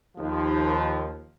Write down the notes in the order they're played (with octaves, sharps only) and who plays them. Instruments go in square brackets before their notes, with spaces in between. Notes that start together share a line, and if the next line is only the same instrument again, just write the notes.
[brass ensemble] D#2 F3